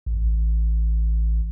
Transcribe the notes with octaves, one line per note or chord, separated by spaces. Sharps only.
A1